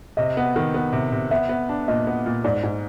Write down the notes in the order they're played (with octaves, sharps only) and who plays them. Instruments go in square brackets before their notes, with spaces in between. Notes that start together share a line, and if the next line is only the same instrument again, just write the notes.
[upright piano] C3 [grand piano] D#5
[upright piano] B3
D#3
B3
C3
C3
[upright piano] B3 [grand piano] E5
[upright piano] B3
D4
[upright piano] A#2 [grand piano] D#5
[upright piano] B3
A#2
[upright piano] G#2 [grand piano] D5
[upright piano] G#2